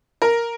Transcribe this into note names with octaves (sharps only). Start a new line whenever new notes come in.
A#4